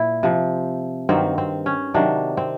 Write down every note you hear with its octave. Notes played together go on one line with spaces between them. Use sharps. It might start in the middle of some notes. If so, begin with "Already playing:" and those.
Already playing: A#2 E4
C3 F3
G2 D#3 F#3 C4
C4
C#4
C3 D#3 F#3 D4
C4